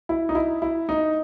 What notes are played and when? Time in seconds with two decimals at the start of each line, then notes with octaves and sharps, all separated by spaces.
0.09 E4
0.29 D#4
0.35 E4
0.62 E4
0.89 D#4